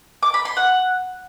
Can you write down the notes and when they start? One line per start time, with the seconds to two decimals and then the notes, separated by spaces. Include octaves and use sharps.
0.23 D6
0.34 B5
0.45 C6
0.57 F#5